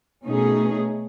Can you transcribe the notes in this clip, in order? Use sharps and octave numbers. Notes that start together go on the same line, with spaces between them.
B2 A3 C#4 D#4 G#4